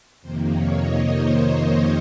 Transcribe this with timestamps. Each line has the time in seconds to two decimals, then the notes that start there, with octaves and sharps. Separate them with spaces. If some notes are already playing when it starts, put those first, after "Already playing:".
0.22 F2 C3 D#3 A#3 C5
0.50 C#5
0.77 D#5
1.07 C5